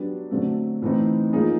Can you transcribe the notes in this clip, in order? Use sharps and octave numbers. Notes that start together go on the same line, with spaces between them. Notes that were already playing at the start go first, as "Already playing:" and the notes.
Already playing: F#3 B3 D4 G4
D3 F#3 A3 C4
A2 E3 A3 C4 D#4
F3 A#3 D#4 G#4